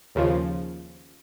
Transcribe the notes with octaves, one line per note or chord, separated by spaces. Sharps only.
D#2 C#3 F3